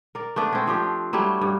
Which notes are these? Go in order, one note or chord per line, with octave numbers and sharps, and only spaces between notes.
A#4 D5
A3 B3 D4 B4
C4 C#4
F3 D4 G4
F#3 G3 A3 E4
G2